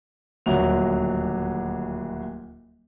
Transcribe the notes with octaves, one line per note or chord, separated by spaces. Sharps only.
D#1 D2 F#3 F7